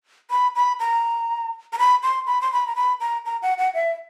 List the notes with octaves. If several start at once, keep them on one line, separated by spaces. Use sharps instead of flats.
B5
B5
A#5
A#5
B5
C6
B5
C6
B5
A#5
B5
A#5
A#5
F#5
F#5
E5